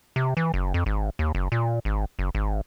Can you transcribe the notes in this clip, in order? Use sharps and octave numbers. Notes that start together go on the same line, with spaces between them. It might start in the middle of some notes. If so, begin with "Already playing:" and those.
C3
E3
F#1
F2
G#1
D#2
F#1
A#2
G#1
F#1
G#1